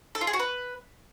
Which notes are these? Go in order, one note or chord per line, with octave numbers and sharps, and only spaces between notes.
A4
F4
G#4
F#4
B4